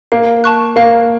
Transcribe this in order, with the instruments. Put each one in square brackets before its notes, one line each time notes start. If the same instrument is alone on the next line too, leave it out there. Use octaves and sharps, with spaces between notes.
[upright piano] A#3 [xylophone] F5
[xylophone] A5 C#6 F#6
[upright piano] A#3 [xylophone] F5